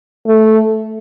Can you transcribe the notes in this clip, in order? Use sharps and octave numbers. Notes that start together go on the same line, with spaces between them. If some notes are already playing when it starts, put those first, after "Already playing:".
A3